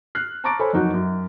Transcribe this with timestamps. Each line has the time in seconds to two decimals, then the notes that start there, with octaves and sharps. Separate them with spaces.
0.15 F6 F#6 C7
0.44 A5 A#5 C#6 D6 A6 D7
0.59 A4 C5 C#5 G#5 B5
0.73 F#1 F2 F#3 D#4 F#4 F#6
0.94 F#2